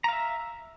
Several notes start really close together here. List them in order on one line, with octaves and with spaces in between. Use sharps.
A#5 F5 E5